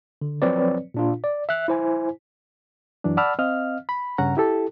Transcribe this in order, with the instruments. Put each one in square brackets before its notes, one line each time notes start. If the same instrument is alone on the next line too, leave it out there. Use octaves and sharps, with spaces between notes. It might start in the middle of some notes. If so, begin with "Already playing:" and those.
[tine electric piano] D3
F3 F#3 C4 B4 C#5 D5
A#2 D4 F4
D5
E5 F#6
E4 C5 G#5
[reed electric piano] F#2 E3 F#3 D4
D5 F#5 A5 B5 E6 F6
C4 D#5 F5 F6
B5
G2 C#3 C#4 F#5 A#5
E4 G4 A4 A5